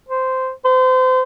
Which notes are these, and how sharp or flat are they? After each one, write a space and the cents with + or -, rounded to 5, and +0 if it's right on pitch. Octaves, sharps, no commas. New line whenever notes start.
C5 -10
C5 -35